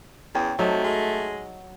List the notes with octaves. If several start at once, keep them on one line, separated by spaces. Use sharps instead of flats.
E2 C#4 G#4 G5
C3 F#3 A3 D#4 G#4 A5
G#3